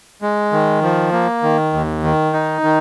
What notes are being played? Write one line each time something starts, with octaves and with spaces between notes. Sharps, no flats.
G#3
D#3
F3
A#3
D#3
D#2
D#3
D#4
D#3